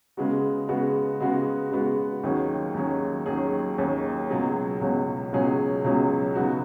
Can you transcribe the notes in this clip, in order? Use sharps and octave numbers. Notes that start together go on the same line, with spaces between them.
C#3 G#3 B3 F#4
C#3 G#3 B3 F#4
C#3 G#3 B3 F#4
C#3 G#3 B3 F#4
D#2 D#3 F#3 C#4 G#4
D#2 D#3 F#3 C#4 G#4
D#2 D#3 F#3 C#4 G#4
D#2 D#3 F#3 C#4 G#4
C#2 B2 F#3 C#4 G#4
C#2 B2 F#3 C#4 G#4
C#2 B2 F#3 C#4 G#4
C#2 B2 F#3 C#4 G#4
C#3 F#3 B3 D#4 F#4